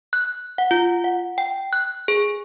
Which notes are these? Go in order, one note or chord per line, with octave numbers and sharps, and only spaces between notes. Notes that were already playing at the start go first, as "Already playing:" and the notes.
F#6
F#5
F4
F#5
G5
F#6
G#4